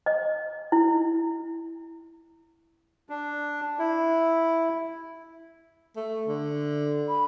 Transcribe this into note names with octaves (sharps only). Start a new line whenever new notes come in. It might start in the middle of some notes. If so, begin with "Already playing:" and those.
D#5
E4
D4
E4
A3
D3
B5